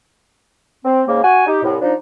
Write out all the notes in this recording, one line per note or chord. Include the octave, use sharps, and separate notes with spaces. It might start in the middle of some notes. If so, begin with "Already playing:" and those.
C4
G#2 C#3 A#3
F#4 F#5 G#5
D#4 G4
C2 A2
F3 D4 D#4